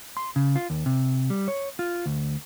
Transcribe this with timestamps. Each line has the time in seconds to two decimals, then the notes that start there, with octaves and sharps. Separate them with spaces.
0.17 C6
0.36 C#3
0.55 F4
0.70 D#2
0.86 C3
1.30 G3
1.48 C#5
1.79 F4
2.06 D2